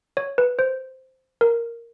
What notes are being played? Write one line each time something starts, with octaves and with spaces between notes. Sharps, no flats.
C#5
B4
C5
A#4